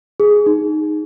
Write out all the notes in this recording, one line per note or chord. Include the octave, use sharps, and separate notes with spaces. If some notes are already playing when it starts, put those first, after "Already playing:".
G#4
D#4